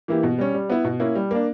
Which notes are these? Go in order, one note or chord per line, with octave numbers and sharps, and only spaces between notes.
E3 A#3 E4 G4
B2
G3 C#4
G3
B3 E4
B2
A#3 C#4 E4
G3
A#3 D4